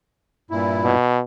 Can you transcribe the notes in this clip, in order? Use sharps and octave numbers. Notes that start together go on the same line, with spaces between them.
G2 A#2 E4
B2